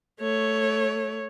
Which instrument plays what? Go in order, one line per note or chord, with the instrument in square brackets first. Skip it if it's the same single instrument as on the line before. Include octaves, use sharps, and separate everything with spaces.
[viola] A3 C#5